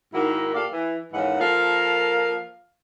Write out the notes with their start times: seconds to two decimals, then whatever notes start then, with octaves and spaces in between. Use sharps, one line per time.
0.14 G#2 D#3 A#3 E4 F#4
0.54 A#2 G4 A4 D5 F5
0.72 E3
1.13 D#2 G#2 C#3 E3 D#4 F#5
1.40 F3 A#3 A4 A#4 F5